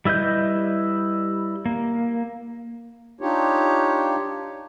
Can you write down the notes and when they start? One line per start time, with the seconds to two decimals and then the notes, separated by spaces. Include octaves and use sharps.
0.05 G3 E4 B4 D#5 G6
1.65 A#3
3.21 D4 D#4 F4 G4 C#5